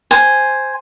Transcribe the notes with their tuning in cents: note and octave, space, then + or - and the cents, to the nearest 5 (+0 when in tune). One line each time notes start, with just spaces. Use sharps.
C5 +0 G#5 +0